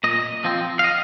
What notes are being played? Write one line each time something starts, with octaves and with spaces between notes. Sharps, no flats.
A#2 D#5
F3 C4
F5
D#5